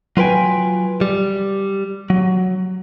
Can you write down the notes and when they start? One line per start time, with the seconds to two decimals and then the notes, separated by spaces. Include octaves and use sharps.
0.17 F#3 F4 B4 G5 G#5
1.01 G3
2.10 F#3